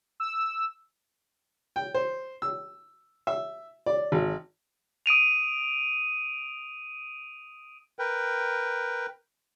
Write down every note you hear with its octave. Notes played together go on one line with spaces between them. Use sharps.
E6
G5
C5
E6
E5
D5
G#1
D#6 D7 D#7 F7
A#4 B4 G5